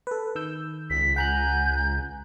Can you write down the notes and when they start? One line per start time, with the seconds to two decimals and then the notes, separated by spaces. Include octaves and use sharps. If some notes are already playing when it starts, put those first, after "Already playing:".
0.07 A4 B4
0.35 D#3 E6 G6
0.90 C#2 B6
1.16 F#5 G#5 A#5 F#6 G6